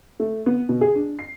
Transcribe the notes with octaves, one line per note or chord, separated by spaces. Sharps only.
A3
B3
B2
G#4
D4
C7